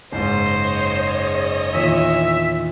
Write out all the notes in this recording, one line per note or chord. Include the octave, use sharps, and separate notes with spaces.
F#1 G#2 C5 C#5 D#5
E2 A#2 D#3 E5